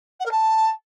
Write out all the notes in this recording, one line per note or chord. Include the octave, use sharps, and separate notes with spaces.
F#5
A#4
A5